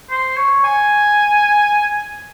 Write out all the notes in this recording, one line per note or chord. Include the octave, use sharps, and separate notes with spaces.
C5
C#5
G#5